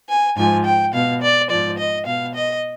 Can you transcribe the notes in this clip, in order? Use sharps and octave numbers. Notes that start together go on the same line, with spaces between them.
G#5
G#2 F3 G#5
G5
B2 F5
D5
G#2 F3 D5
D#5
B2 F5
D#5